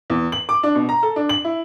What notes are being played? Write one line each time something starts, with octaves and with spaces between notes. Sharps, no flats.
E2
F#7
D6
D4
B2
A#5
A4
D4
F#7
E4